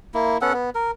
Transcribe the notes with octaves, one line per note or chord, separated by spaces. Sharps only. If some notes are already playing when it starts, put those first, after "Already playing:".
A#3 E4
B3 C#4 A4 F#5
B3
A#4